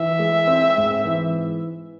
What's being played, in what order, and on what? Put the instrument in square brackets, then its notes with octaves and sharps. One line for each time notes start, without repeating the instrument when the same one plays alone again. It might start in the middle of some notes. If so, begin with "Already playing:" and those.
Already playing: [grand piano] E3 [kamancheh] E5
[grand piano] G#3
C4
G#2
E3